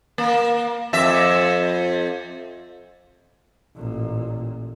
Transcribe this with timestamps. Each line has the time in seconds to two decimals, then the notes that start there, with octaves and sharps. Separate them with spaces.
0.18 A#3
0.93 F2 E5
3.77 A1 A#2